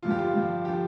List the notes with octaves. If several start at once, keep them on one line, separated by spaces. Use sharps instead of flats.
G2 D3 F3 F4
G4
F4
G2 D3 F3
D3 F3 G4